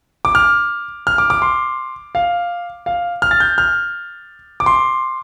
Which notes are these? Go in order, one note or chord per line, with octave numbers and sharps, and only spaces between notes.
D6
F6
F6
D6
D6
C6
F5
F5
F6
A6
G6
F6
D6
C6